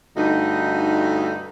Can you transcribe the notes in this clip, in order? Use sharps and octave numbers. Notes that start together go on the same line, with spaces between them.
D2 G2 D#4